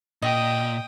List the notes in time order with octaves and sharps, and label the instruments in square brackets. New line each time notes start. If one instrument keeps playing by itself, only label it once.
[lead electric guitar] A#2 [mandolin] D#5 [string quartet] G5 D#6